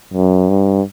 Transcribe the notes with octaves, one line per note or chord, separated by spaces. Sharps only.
F#2
G2